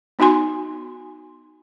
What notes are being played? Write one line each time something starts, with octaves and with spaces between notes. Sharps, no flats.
B3 D#4 F#4 G#5 C6